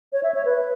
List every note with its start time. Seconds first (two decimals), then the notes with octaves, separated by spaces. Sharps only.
0.13 C#5
0.23 E5
0.34 C#5
0.45 B4